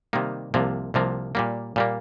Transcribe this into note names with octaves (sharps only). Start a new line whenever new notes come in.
C3 D#3 G3 A#3 D#4
C2 C3 F3 A#3
C2 C3 F3 A#3
A#2 G3 A#3
A#2 G3 A#3